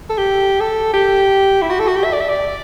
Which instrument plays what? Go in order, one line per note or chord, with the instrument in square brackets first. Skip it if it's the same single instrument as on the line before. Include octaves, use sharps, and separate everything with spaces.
[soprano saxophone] A4
G4
A4
G4
E4
F#4
A4
F#4
G4
E5
D5
E5
D5